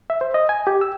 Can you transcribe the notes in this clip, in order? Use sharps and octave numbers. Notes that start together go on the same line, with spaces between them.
E5
C5
D#5
G#5
G4
E6